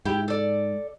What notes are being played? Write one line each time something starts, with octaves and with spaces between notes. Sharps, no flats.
G#2 E4 G4 G5
A4 D5